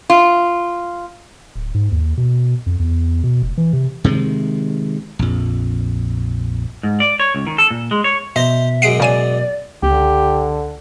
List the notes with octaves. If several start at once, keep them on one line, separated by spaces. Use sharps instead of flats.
F4
D1
G#2
D#2
B2
F2
E2
B2
F1
E3
C3
C3 D#3 G#3
A#1 F2
G#2
D5
C#5
C#2
D#3
A4
A#2
G#3
C#5
B2 C5 D#5 E5 A#5 C6
F#2 G#3 F#5 C7 D7
C#3 D5 G#5 D#7
C#2 D3 G4